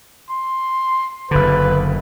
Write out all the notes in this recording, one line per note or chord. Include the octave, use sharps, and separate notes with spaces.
C6
F#1 D3 B4